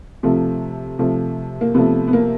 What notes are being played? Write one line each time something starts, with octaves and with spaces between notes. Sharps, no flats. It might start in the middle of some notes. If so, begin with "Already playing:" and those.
C3 F3 A3
C3 F3 A3
A#3
C3 F3 A3 B3
B3
A#3